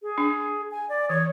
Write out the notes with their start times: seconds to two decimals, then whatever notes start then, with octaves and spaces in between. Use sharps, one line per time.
0.02 G#4
0.18 D4
0.71 G#5
0.89 D5
1.09 E3 C#5